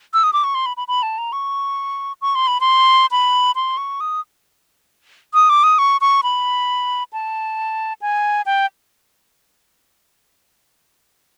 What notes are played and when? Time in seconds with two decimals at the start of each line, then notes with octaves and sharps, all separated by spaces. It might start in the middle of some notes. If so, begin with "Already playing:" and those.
0.14 E6
0.23 D#6
0.33 D6
0.44 C#6
0.55 C6
0.66 B5
0.77 B5
0.88 B5
1.03 A5
1.18 A#5
1.32 C#6
2.21 C#6
2.35 C6
2.47 B5
2.61 C6
3.11 B5
3.56 C6
3.77 C#6
4.00 D#6
5.34 D#6
5.50 D6
5.64 D#6
5.79 C#6
6.01 C#6
6.23 B5
7.13 A5
8.02 G#5
8.46 G5